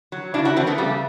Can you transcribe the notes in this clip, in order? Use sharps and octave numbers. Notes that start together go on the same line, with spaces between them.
F#3
C#3 D4 E4
E4 F#4
E3 C4 D4
A3 B3
C#3 G3 A3